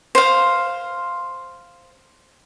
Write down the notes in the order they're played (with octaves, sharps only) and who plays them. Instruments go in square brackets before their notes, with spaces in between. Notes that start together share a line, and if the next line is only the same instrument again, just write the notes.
[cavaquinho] C5 F5